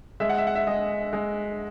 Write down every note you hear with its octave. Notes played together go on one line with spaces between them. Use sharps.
G#3 E5
F#5
E5
F#5
E5
G#3 D#5
G#3